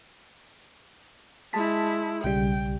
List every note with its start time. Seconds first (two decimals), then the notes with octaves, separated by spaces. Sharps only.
1.53 G#3 E4 A5 B6
2.24 B1 C#3 G3 G5